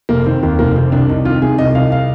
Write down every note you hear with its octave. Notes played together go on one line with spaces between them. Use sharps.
F1 A#3
D#3 C4
D#2 A#3
F1 A#3
F1 C4
C2 D4
C2 D#4
D#3 F4
C3 G#4
C2 D#5
C2 F5
F5